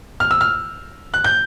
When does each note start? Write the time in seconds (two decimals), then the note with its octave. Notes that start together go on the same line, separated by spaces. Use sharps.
0.20 F6
0.31 E6
0.41 F6
1.14 F#6
1.24 G6